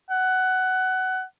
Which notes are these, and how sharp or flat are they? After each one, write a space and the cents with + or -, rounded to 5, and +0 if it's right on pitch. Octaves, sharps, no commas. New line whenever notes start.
F#5 +15